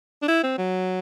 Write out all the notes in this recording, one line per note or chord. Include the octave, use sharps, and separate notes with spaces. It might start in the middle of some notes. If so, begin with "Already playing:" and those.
D4
E4
C4
F#3